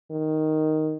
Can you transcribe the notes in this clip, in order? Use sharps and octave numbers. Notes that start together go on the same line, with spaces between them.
D#3